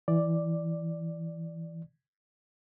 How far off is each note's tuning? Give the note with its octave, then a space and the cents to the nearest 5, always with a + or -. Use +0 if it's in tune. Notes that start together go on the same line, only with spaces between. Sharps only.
E3 +0 D5 +0